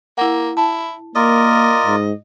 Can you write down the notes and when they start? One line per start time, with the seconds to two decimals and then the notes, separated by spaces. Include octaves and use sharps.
0.18 A#3 E4 F#5
0.57 E4 A5
1.15 A#3 F4 A#4 D5 D#5
1.86 G#2